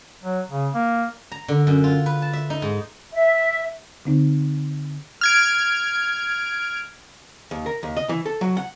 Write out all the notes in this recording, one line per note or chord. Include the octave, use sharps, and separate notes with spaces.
F#3
C#3
A#3
A#5
D3
F#2
F4
B4
A5
E5
D#4
G#2
E5
D3 C4 D#4
F6 G#6 D7
D#2
A#4
D#2
D#5
E3
A4
F#3
F#5